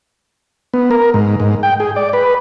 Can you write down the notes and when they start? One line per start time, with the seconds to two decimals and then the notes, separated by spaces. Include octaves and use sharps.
0.74 B3
0.91 A#4
1.14 G#2
1.40 G#2
1.63 G5
1.80 G#4
1.96 D5
2.13 B4